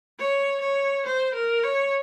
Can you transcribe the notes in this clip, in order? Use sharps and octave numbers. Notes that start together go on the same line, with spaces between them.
C#5
C#5
C5
A#4
C#5